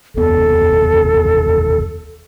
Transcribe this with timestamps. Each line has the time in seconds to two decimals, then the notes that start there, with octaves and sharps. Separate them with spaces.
0.16 F1 D#2 B3 A4